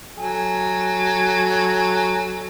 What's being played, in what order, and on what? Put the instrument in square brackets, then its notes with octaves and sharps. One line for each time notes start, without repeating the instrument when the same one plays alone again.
[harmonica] F#3 A4 G#5